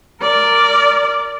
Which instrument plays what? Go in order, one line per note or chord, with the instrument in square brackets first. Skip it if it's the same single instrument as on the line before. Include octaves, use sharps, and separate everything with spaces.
[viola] A#4 D5